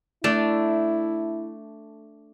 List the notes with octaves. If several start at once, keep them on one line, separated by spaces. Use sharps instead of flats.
A3 D4 E4